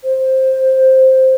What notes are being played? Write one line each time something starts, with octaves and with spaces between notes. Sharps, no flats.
C5